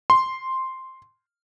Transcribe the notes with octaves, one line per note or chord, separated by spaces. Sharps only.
C6